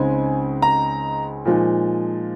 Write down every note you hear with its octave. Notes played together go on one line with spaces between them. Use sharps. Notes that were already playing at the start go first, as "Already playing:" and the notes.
Already playing: C#2 C#3 G#3 C4 D#4 G#5
A#5
A#2 F3 G#3 D#4